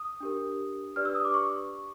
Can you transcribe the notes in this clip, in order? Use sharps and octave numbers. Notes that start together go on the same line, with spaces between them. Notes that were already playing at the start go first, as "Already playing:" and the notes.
Already playing: D#6
D4 G4 A#4
D4 G4 B4 D5 F6
E6
D#6
D6
C#6